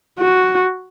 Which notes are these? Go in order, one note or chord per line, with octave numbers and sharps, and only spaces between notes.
F#4